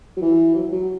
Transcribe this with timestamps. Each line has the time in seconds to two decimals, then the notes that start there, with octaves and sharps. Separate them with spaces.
0.17 F#3
0.22 E3
0.55 F#3
0.72 F#3